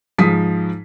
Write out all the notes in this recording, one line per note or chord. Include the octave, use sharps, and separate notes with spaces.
G#2 F3 D#6 B6